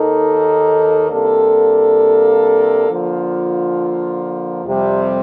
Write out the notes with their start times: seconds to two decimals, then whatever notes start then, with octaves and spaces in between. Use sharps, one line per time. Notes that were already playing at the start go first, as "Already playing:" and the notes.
Already playing: D#2 D#3 A#3 D#4 A4
1.10 C3 G3 A#3 D4 A4
2.87 D3 F3 A#3 F4
4.64 F2 C3 G3